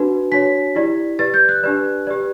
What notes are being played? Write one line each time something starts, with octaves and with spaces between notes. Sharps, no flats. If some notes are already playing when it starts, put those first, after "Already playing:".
Already playing: D4 F#4 B4
D4 F#4 C#5 B6
E4 G4 D5
G4 B4 D5 A6
G6
F#6
D4 G4 B4 D5
G4 B4 D5